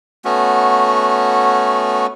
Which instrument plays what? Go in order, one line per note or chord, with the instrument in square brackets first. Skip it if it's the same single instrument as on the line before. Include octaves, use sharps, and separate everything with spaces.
[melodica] A3 B3 C#4 F#4